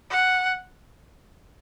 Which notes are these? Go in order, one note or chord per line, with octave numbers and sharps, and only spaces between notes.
F#5